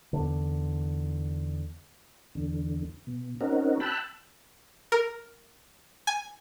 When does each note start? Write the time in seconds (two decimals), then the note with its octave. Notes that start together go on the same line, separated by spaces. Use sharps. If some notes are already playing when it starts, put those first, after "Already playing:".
0.13 E2 D3
2.35 E2 D3
3.07 B2
3.41 C4 C#4 D#4 F#4 A#4
3.80 G5 A5 B5 E6 F#6
4.92 A#4
6.07 G#5